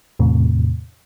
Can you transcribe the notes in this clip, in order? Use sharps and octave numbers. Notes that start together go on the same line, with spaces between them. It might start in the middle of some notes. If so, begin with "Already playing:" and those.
E2 A2 C3